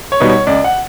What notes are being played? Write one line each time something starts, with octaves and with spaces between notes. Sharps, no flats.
C#5
B2 G3 B3 D#4
C#5
C#2 D5
F#5